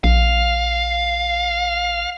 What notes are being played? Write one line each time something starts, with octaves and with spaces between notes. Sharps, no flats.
A#1 F5